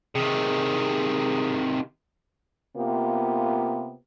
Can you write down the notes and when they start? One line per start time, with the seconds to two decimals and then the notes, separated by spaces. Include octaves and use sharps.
0.15 C3 D#3 G#4
2.77 C3 A#3 B3 F4 G4